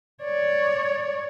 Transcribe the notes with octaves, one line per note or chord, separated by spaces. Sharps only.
C#5 D5